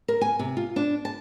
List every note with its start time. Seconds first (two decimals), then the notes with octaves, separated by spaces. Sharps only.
0.08 A#4
0.21 G#5
0.39 C3
0.57 F4
0.76 D4
1.05 A5